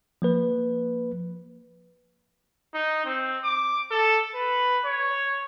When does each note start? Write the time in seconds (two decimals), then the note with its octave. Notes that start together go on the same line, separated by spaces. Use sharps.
0.22 F3 A#3 B4
2.74 D#4
3.05 C4
3.44 D6
3.91 A4
4.35 B4
4.85 C#5